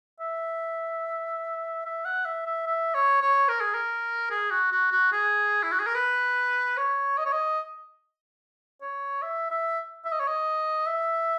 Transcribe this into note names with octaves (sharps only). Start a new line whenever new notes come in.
E5
E5
F#5
E5
E5
E5
C#5
C#5
A#4
G#4
A#4
G#4
F#4
F#4
F#4
G#4
E4
F#4
G#4
A#4
B4
C#5
D#5
C#5
D#5
C#5
E5
E5
E5
D#5
C#5
D#5
E5